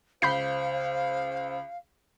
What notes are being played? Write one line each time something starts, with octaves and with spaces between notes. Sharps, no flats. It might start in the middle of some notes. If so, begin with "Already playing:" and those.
C#2 C5 F5 B5 G6 C7